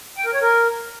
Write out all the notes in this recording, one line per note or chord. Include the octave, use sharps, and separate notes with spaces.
G5
A#4
C#5
A#4